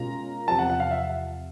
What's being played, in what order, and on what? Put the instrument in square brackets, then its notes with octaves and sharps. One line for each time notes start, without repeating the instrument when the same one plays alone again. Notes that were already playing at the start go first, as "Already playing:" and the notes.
Already playing: [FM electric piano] B2 G#3 C#4 F4 A#4 [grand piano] A#5
[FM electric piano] E2 C3 F3 [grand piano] A5
[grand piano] F#5
F#5
F5
E5